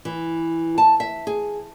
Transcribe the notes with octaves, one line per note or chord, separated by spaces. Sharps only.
E3
A5
E5
G#4